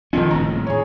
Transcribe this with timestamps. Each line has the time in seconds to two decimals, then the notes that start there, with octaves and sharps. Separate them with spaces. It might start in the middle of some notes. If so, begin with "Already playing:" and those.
0.13 F2 D3 D#3 C4 C#4
0.31 D#1 A2 C#3 A#5
0.67 G#4 C#5